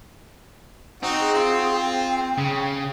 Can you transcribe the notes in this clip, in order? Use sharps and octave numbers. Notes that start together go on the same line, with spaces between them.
C4 D#4 F#4
G#4
F4
G5
C#3